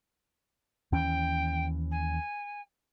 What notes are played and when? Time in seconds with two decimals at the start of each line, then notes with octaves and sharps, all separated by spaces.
0.92 D#2 E3 C#4 G5
1.91 G#5